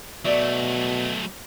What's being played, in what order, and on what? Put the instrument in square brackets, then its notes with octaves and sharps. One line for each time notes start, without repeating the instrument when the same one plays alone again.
[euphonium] B2 [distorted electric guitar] F#3 A3 [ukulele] D5 E5